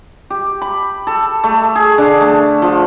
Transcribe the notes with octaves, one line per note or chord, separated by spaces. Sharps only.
G4
B5
A4
A3
G#4
D3
A3
F3